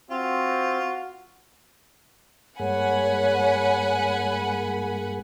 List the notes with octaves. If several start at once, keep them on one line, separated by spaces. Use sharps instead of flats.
C4 F4 F#4
G2 G#3 A#3 C#5 F#5 G#5 B5